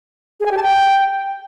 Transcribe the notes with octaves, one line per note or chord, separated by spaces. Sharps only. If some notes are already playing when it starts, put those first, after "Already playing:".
G#4
G#5
G4
A5
G5